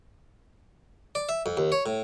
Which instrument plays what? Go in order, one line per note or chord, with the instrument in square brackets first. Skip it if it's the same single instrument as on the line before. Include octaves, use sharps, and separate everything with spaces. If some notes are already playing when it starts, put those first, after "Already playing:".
[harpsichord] D5
E5
F2
D#2
C#5
A2